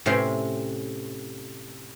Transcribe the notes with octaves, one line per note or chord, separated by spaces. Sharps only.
A2 C3 C#4 G4 C5 C6